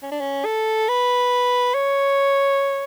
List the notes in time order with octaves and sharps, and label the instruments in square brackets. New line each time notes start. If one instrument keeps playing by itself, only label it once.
[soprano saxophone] C#4
D4
C#4
A4
B4
C#5